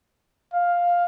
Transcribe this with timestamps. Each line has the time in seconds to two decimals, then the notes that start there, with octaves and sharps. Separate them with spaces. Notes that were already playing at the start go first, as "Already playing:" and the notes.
0.54 F5